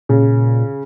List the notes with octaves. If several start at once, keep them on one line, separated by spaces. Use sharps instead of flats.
A#2 C#3